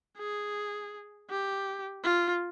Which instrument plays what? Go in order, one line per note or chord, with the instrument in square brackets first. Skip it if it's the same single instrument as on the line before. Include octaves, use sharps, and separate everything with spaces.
[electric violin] G#4
G4
F4